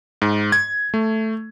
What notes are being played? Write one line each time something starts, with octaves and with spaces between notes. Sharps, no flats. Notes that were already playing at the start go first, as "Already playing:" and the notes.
G#2
G#6
A3